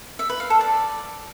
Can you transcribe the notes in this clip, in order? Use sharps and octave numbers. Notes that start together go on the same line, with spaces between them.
E5
B4
F5
A4
D5